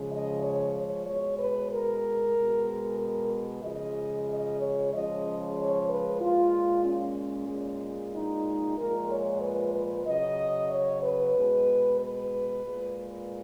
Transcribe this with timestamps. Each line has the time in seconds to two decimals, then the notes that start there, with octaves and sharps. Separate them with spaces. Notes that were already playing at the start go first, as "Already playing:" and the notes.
Already playing: C#3 F3 G#3
0.09 D#5
0.42 C#5
0.75 C#5
1.06 B2 G#3 C#5
1.38 B4
1.71 A#4
2.36 B2 G#3
2.99 A#4
3.63 C#3 F3 G#3 D#5
4.28 D#5
4.60 C#5
4.92 C#3 F3 G#3 D#5
5.56 C#5
5.88 B4
6.21 A#2 G#3 F4
6.85 C#4
7.49 A#2 G#3
8.13 D#4
8.77 A#2 F3 G#3 A#4
9.10 C#5
9.41 B4
9.74 B4
10.06 C#3 F#3 D#5
10.70 C#5
11.02 B4
11.35 B2 G#3
11.99 B4
12.64 A#2 G#3